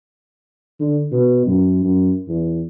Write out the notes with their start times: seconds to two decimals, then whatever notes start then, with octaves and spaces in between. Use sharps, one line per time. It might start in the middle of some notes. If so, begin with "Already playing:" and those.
0.80 D3
1.12 B2
1.46 F#2
1.84 F#2
2.28 E2